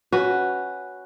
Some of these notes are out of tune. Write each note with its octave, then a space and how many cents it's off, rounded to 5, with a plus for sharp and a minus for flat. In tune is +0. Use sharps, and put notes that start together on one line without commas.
C#4 +0 F#4 +0 B4 +0